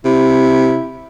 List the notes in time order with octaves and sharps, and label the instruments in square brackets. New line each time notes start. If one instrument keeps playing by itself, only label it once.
[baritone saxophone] C3 [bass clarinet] E4